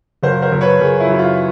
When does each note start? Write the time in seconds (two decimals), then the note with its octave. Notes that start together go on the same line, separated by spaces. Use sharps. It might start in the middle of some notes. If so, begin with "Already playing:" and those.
0.23 F#1 A#4 C5
0.42 A#4 C5
0.52 F#1
0.61 B4 C#5
0.81 F#1 G#4 A#4
1.00 E4
1.09 F#2
1.19 F4